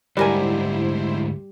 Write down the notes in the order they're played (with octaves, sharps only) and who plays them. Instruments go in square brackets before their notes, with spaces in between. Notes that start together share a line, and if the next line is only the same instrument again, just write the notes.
[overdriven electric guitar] D2 G#2 [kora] G3 [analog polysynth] E4 C5 [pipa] F#4 A#4 G#5